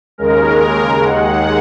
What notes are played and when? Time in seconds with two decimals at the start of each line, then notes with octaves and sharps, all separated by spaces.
0.18 D#2 C#3 G#3 A#4
1.04 D#2 D#3 G#3 F#5